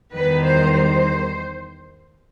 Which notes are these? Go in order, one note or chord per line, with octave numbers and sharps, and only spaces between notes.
E2 D#3 G3 B4
C5
C5